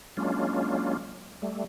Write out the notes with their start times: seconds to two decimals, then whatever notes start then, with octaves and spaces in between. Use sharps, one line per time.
0.17 F#3 G#3 A#3 C#4 D4 F4
1.42 G3 A3